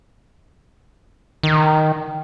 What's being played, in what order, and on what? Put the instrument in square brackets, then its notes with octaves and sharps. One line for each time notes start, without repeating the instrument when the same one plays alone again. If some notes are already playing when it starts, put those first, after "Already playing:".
[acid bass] D#3